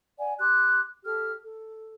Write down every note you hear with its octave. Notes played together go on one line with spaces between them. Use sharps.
D5 F#5 G#5
G4 C6 D6 F#6
G4 A4 F6
A4